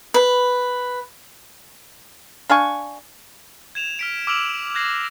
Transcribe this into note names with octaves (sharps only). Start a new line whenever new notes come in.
B4
D4 F5 G#5 C#6
G#6 E7 F7
F6 B6 D7
D6 E6 F6 D7 F7 F#7
F#6 G#6 A#6 C7 F#7